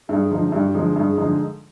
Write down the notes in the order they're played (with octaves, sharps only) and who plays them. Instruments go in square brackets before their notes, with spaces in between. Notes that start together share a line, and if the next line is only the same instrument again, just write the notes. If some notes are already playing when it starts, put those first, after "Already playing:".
[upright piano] G2 [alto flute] G#4
[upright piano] D3 F3 G#3 D#4
[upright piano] G2 [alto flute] G4
[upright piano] D3 F3 G#3 D#4
[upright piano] G2 [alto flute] G#4
[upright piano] D3 F3 G#3 D#4